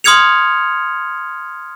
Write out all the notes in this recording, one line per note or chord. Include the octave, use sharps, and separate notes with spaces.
C6 D#6 F6 G#6 C#7 F7